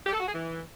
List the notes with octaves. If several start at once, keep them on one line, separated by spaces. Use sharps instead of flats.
G4
A4
F#4
G#4
E3